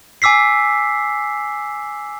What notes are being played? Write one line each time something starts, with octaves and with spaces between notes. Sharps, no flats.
G#5 D6 E6 B6 C7